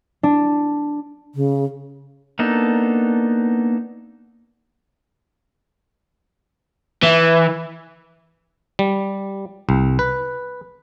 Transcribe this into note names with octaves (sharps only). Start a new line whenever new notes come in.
D4
C#3
A#3 B3 D4 D#4 A4
E3
G3
C2
B4